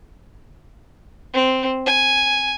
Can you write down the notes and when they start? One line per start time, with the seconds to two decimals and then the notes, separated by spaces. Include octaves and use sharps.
1.34 C4
1.86 G#5